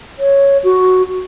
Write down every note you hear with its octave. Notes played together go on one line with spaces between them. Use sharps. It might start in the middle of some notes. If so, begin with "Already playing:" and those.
C#5
F#4